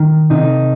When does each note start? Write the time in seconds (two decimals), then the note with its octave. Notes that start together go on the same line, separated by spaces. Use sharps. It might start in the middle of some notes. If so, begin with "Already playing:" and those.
Already playing: D#3
0.30 C3 D#4